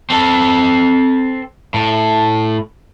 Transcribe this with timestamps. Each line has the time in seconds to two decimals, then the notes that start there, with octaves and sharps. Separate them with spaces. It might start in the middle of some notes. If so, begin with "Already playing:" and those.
0.10 C4 A4
1.74 A2